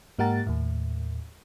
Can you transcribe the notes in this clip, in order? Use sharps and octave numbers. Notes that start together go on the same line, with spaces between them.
G#2 A#3 G4 F#5 A#5 A6
D#2 A2